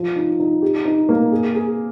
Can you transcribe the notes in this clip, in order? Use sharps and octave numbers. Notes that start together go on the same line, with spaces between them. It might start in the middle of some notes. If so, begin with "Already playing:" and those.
Already playing: F3
D#4
D#4
G4
D#4
A#3
G#4
G#4